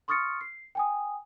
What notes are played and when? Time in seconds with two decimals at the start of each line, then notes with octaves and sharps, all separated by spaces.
0.08 C6 C#6 D#6 F6 A6 C#7
0.41 C7
0.75 G5 G#5 D#6